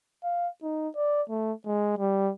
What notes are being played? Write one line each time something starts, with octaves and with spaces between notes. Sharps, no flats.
F5
D#4
D5
A3
G#3
G3